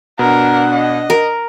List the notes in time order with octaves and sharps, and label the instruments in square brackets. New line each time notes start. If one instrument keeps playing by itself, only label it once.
[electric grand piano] B2 [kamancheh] D4 F#5 [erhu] A#4
[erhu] D#5
[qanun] A#4